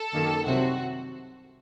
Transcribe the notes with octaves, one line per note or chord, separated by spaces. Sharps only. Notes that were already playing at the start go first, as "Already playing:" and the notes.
Already playing: A4
F#2 D#3 A#3
C2 C3 F#3 C4 F#4